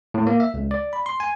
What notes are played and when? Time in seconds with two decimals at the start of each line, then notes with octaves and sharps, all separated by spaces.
0.14 A2
0.27 A#3
0.40 E5
0.54 C#2
0.71 D5
0.93 B5
1.06 C6
1.20 G#5